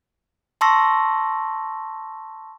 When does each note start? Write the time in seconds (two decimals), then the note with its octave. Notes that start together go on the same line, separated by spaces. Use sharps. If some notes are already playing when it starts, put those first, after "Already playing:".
0.61 A5 C6 C#6 E6 A#6